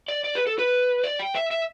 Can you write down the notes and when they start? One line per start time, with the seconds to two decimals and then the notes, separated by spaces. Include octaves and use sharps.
0.08 D5
0.24 D5
0.35 B4
0.47 A4
0.59 B4
1.04 D5
1.19 G5
1.35 E5
1.51 E5